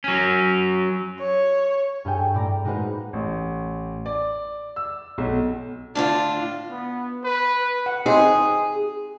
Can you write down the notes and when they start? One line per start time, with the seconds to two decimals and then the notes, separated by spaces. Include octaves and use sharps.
0.04 F#3 C#4
1.20 C#5
2.05 G2 G#4 A4 G5 G#5
2.34 A2 D5 A#5
2.65 G#3 A#3 D#4 F#4 B4 C5
3.13 A1
4.06 D5
4.76 E6
5.18 B1
5.95 A2 D3 D4 F4
6.70 B3
7.24 B4
7.86 F#5
8.06 C4 D#4 G#4 C5